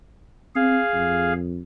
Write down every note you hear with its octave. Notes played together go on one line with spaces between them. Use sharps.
C4 G#4 F5
F2